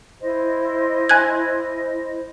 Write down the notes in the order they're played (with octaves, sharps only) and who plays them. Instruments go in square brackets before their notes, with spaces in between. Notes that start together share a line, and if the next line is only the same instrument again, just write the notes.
[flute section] E4 C5 D#5
[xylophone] G#5 F#6 G#6